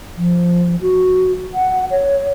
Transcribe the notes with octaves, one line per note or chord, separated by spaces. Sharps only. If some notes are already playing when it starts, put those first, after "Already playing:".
F3
F#4
F#5
C#5